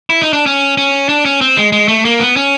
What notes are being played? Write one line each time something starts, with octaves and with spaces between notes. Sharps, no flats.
E4
D#4
D4
C#4
C#4
D4
C#4
C4
G#3
G#3
A3
A#3
B3
C#4